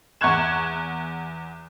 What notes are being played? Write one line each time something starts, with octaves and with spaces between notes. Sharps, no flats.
E2 F#5 C#6 F#6 G#6 E7